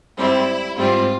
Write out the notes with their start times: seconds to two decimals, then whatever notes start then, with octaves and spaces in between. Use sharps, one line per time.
0.17 G#2 G3 C4 E4
0.78 G#2 G3 C4 E4 F4